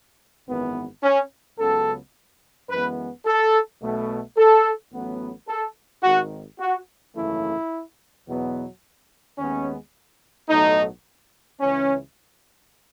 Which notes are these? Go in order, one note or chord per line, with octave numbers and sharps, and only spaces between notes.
G#1 F#2 E3 B3
C#4
C#2 C#3 F#3 B3 A4
F#2 E3 G#3 B3 B4
A4
B1 B2 A3
A4
A1 A2 F#3 B3
A4
G#1 G#2 D#3 F#4
F#4
G#1 F#2 C#3 E3 A3 E4
E2 B2 F#3 B3
D#2 D#3 G#3 B3 C#4
B1 A2 F#3 A3 D#4
C#2 C#3 E3 C#4